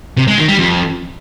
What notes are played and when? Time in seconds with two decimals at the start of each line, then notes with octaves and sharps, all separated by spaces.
0.17 C3
0.27 G#3
0.38 D#3
0.48 G3
0.58 F2